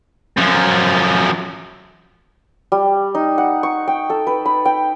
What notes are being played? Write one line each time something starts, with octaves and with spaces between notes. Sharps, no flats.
F#2 F3
G3
D#4
F#5
C#6
G5
A4
B4
B5
G5